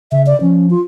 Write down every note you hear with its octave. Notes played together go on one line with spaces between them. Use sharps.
C#3 E5
D5
F3 C#4
F4